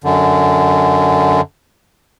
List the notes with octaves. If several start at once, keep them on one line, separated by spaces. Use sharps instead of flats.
F#2 D3